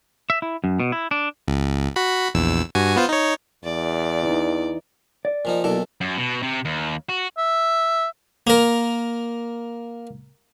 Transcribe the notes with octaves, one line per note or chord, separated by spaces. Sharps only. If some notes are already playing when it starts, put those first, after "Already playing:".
E5
E4
F#2
B2
E4
D4
C#2
F#4 B5
A#1 E2 E6
G2 F#4 G#5
B3 F4 C5
D#4 C#5
E2 D5
E3 D#4
D5
A#2 F3 D#4
B1 A#2 E4 F#4 A4 D5
F#2
B2
C3
D#2
F#4
E5
A#3 A#4